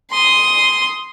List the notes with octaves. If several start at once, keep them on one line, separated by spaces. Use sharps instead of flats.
C6 D#6